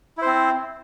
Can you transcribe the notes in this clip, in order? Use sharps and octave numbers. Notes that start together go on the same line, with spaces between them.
C4 E4 C5